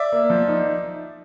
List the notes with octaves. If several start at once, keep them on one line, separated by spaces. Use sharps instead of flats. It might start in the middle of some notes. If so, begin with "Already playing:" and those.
Already playing: D5 E5
A#3
F3
D#4